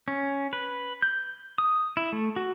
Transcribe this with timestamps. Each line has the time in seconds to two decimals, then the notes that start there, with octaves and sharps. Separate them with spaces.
0.08 C#4
0.53 B4
1.02 G6
1.58 D#6
1.97 E4
2.13 A3
2.36 F#4